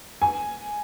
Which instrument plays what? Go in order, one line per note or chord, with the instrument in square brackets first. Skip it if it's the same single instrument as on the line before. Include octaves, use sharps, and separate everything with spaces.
[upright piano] G#5